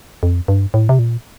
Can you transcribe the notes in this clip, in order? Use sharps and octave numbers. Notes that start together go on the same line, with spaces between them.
F2
G2
A2
C3
A#2